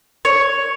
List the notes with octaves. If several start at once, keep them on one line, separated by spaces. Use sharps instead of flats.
C#5